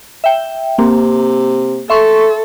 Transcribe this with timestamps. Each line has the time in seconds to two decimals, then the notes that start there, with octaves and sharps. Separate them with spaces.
0.24 E5 G5
0.78 C3 A#3 C4
1.90 A4 E5 C6 C#6